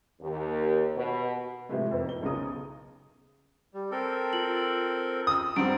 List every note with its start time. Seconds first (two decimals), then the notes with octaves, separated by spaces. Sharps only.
0.20 D#2
0.95 B2
1.69 A2 C3 E3 F3 G#3 A3
1.91 F2 B3
2.05 D#4 G7
2.23 B1 C#3 A#5 D#6
3.74 G3
3.91 C4 A4 A#4
4.33 F4 F#7
5.27 D#6 E6
5.56 G2 C4 F#5 A#5 D7